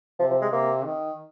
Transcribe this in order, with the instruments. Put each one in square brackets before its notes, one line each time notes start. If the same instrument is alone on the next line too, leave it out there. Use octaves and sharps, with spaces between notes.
[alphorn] C3 [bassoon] F3
[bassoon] F3
G#3
[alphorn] C3 [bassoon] A#3
[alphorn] D#3